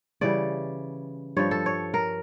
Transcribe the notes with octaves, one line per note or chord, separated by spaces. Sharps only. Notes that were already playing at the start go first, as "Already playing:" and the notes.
C#3 E3 G3 D5
G2 F3 C#5
A4
C#5
A#4